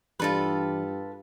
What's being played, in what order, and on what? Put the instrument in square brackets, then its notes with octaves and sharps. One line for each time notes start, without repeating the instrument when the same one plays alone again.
[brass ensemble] G2 G4 [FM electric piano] E3 D4 [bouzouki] F4 A4 B4